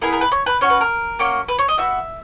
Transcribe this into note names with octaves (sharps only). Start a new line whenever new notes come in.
B3 E4 G#4 A#4
A#4
B4
C#5
B4
C#4 F#4 C#5
B4
A#4
A#3 C#4 F#4
B4
C#5
D#5
B3 D#4 F#4 E5